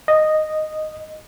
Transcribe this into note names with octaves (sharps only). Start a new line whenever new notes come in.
D#5